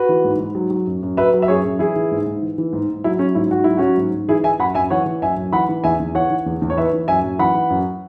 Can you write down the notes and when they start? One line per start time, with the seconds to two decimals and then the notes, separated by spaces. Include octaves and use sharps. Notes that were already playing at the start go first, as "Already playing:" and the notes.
Already playing: F#4 B4
0.09 E3
0.24 G#2
0.39 G#2
0.55 F#3
0.70 F#3
0.87 F#2
1.03 F#2
1.17 F#3 B4 E5
1.34 F#3
1.42 E5
1.48 F#2 G#4 C#5
1.64 F#2
1.79 E3 E4 G#4
1.96 E3
2.11 G#2
2.26 G#2
2.42 E3
2.58 E3
2.73 G#2
2.89 G#2
3.04 F#3 E4
3.19 F#3 C#4
3.35 G#2 E4
3.50 G#2 F#4
3.64 F#3 E4
3.77 F#3 C#4 F#4
3.97 G#2
4.13 G#2
4.28 E3 E4 G#4
4.44 E3 E5 G#5
4.59 F#2 F#5 B5
4.75 F#2 E5 G#5
4.90 E3 C#5 F#5
5.06 E3
5.22 F#2 E5 G#5
5.37 F#2
5.52 E3 F#5 B5
5.69 E3
5.84 E2 E5 G#5
6.00 E2
6.15 E3 C#5 F#5
6.30 E3
6.46 E2
6.62 E2
6.70 C#5
6.77 E3 B4 E5
6.93 E3
7.08 F#2 E5 G#5
7.24 F#2
7.39 E3 F#5 B5
7.55 E3
7.70 F#2